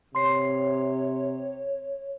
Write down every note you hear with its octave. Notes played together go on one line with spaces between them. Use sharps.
C3 C#5 C6 C7